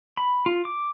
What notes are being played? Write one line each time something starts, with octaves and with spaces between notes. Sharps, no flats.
B5
F4
D6